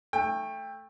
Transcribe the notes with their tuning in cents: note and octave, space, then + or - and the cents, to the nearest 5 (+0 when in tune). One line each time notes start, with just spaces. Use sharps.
A3 +0 G5 +25